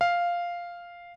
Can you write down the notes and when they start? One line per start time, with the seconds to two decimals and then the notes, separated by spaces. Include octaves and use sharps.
0.01 F5